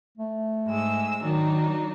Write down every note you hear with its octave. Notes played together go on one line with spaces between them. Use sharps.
A3
G#2 G#3 E6
D#3 F#3 D4 D#4